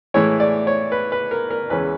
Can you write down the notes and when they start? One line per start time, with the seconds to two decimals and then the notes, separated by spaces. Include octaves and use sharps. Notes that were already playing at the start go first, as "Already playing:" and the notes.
0.14 A2 E3 G#3 C#5
0.40 D5
0.67 C#5
0.92 B4
1.12 B4
1.31 A#4
1.51 A#4
1.70 E2 C#3 E3 G#3 C#4 B4